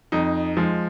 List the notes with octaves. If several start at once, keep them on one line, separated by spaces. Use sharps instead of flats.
F2 D#4
F3 G#3